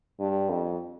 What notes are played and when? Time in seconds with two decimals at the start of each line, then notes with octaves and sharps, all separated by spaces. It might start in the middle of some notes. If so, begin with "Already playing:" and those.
0.20 G2
0.50 F2